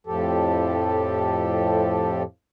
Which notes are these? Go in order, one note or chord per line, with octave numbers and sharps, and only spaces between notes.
F2 A2 F3 G4 A4